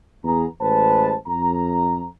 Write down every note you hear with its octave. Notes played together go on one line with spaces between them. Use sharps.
E2 B3 G#4 A#5
A1 G#3 B4 C5 A5
F2 A#5